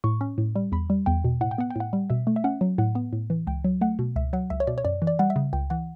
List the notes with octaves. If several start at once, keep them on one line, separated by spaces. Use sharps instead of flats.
A2 C#6
C#4
A2
G3
E2 B5
G3
E2 G5
B2
A2 F#5
G5
B3 F#5
G5
A2 F#5
G3
B2 E5
A3
E5
C#4 F#5
F#3
A2 F#5
B3
A2
E3
C#2 G5
F#3
A3 F#5
B2
C#2 E5
F#3 F#5
C#2 E5
C#5
B2 D5
C#5
F#2 D5
E3
D5
G3 F#5
E5
C#3
C#2 G5
E3 F#5